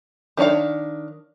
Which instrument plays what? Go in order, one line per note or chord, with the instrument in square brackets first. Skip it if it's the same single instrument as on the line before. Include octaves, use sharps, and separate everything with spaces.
[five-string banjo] D#3 C#4 D4 C#5 F5